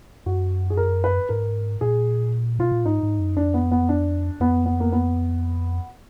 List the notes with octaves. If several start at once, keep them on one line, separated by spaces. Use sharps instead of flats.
F#2 F#4
G#4
A#4
B4
G#2 A#4
A#2 G#4
B2 F4
A#2
G#2 D#4
G#2
F#2
F2 D4
B3
B3
D4
F2 B3
B3
A#3
B3